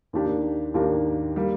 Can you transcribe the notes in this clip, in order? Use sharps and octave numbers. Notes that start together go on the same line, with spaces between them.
D#2 D#3 A#3 D4 G4
D#2 D#3 A#3 D4 G4
G3 A#3